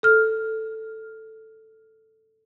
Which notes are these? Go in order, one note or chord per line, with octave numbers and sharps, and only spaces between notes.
A4 F6